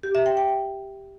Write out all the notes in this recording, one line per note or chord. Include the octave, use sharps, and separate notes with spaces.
G4
E5
G5
G5